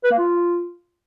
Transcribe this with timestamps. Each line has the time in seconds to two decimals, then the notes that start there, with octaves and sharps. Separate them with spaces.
0.04 B4
0.11 A#3
0.18 F4